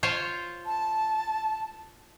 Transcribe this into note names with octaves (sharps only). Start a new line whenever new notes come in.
F4 C5 C#5
A5